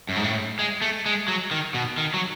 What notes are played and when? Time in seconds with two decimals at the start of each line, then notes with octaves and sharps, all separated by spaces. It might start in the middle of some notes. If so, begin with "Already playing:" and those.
0.09 F#2
0.16 G#2
0.24 A2
0.59 G#3
0.82 A3
1.06 G#3
1.28 F#3
1.51 D#3
1.74 B2
1.98 D#3
2.14 F#3